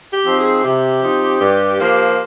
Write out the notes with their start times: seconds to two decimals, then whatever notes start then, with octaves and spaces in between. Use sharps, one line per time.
0.12 G4
0.26 F3 C4 D#4
0.38 G#4
0.63 C3 G4
1.02 F3 C4 D#4
1.40 G2
1.79 F3 A#3